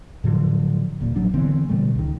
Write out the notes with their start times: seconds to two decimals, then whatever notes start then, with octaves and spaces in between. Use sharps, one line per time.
0.24 A2 D3 F3 F#3
1.01 D#1 A#2
1.16 A1 F#3 D4
1.34 D3 E3 B3 C4
1.69 B2 D3 G3 A3
1.95 C#2 D#3